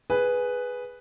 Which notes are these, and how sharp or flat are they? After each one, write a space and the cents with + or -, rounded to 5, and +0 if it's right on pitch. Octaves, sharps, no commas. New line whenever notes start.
G#4 +0 B4 +0